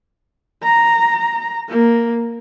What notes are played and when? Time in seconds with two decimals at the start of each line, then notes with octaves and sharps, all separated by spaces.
0.63 A#5
1.69 A#3